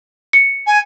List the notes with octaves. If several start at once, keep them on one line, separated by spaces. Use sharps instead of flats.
C#7
G#5